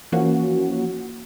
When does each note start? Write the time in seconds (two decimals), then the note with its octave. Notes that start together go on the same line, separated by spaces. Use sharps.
0.12 E3 F3 A#3 C#4 F#4